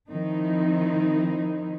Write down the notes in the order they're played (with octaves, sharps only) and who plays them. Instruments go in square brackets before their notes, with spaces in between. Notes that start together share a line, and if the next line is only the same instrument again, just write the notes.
[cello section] D#3 F3 C4 D#4 E4